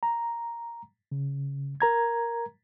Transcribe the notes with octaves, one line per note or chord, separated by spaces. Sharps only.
A#5
C#3
A#4 A#5 G#6